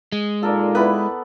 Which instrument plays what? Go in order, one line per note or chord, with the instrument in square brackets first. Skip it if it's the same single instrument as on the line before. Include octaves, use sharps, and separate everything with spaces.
[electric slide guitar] G#3
[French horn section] A#2 D#4 F4 [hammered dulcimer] A4 A#4 D5
[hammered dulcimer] B3 [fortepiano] E4 B4